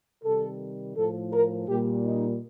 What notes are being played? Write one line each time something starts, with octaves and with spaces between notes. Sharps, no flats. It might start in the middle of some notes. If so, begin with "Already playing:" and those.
C3 D#3 G3 A4
A2 F3 A4
A#4
A#2 G3 G4
D#4